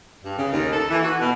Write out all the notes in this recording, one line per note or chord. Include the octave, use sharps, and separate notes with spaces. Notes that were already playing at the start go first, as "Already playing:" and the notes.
G2
C#3
D#2
A4
E3
F#4
B2